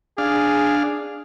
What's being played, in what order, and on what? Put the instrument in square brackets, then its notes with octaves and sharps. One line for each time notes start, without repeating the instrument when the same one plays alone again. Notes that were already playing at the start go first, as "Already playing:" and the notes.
[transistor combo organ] D4 F5 [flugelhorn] G#4